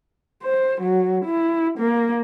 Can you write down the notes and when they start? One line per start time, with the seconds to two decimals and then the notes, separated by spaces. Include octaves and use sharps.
0.43 C5
0.81 F#3
1.25 E4
1.79 A#3